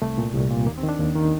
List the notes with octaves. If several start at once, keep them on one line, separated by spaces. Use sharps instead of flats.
C2 A3
A#2
C2
A#2
D#2 A#3
C4
D#3
D4
D#2
D#3